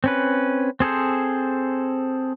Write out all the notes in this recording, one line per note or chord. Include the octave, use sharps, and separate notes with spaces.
C4 C#4 B4
C4 G#4 A4 C5